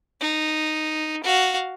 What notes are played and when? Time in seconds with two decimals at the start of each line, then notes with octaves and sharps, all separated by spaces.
0.21 D#4
1.24 F#4 F5